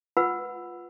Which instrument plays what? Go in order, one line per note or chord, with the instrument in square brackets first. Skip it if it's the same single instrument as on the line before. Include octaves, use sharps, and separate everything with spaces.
[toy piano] F4 B4 F#5 E6